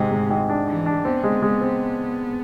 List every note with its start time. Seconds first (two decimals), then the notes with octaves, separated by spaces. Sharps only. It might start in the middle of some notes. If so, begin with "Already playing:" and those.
Already playing: G#1 G#2 C3 G#3
0.11 G#2
0.30 G#1
0.49 D4
0.67 E3 D4
0.86 D4
1.05 B3 C4
1.24 G#3
1.42 G#3
1.61 C4